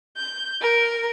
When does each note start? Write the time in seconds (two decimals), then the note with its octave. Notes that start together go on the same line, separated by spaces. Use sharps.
0.17 G6
0.62 A#4